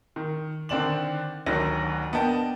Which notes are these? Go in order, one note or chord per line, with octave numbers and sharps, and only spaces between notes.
D#3
D3 D#3 C4 D5 E7 F#7
A1 D2 D3 D#3 F#3 A#6
B3 D4 A#4 D#5 G5 A5